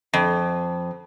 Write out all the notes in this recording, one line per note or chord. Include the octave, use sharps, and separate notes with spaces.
F2